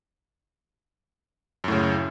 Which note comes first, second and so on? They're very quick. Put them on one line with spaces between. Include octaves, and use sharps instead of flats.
F#2 A2 C#3